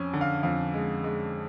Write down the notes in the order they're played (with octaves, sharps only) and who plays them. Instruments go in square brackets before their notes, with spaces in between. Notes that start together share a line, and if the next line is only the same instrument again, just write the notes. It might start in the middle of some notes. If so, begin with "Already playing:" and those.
Already playing: [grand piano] F2 C#4 G#5
D3
F5
F2 F5
G#3
G#3